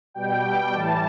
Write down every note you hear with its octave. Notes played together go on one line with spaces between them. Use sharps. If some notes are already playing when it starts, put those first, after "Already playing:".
B2 G3 G5
A2 E3 G3 A5